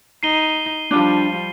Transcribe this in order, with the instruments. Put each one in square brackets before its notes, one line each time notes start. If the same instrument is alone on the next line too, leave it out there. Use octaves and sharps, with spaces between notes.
[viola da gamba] D#4 [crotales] C7 D#7 G7
[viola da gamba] F3 G3 [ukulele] D4 F4